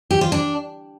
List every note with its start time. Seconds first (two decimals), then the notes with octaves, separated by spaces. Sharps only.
0.11 G4
0.21 F4
0.32 D4